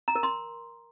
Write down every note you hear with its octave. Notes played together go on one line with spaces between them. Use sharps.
A#5
A#4
C6